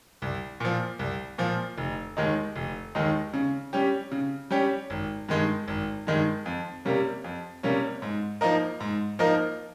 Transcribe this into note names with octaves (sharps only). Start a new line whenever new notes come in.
C2
A#2 F3
C2
A#2 F3
F1
D#2 D#3 G#3 D#4
F1
D#2 D#3 G#3 D#4
C#3
G3 C#4 G4
C#3
G3 C#4 G4
G#1
G2 D#3 G#3
G#1
G2 D#3 G#3
F2
C3 G3 A#3 C#4
F2
C3 G3 A#3 C#4
G#2
F3 A#3 D#4 A#4
G#2
F3 A#3 D#4 A#4